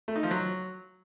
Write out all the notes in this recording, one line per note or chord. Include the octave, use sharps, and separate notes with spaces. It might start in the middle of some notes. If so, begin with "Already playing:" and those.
A3
D#4
F3
F#3